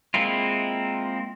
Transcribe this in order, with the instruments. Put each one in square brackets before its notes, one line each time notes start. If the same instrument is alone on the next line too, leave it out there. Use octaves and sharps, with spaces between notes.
[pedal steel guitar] G#3 A#3 C4 E4 F4